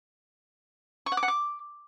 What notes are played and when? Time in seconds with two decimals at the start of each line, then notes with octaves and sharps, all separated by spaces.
1.06 C#6
1.12 F#5
1.17 D6
1.23 F#5
1.28 D6